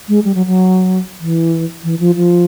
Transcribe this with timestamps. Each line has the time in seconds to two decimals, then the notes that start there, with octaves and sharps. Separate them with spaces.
0.09 G#3
0.25 G3
0.35 F#3
0.47 F#3
1.20 E3
1.84 E3
2.00 F3
2.16 F3